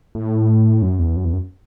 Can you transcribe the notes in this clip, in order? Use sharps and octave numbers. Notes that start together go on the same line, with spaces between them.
A2
F#2
E2
F#2
E2
F#2